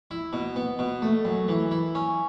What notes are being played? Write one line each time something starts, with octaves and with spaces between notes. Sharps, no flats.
E4
B2
B3
B2
A3
F#2
E3
E4
C#4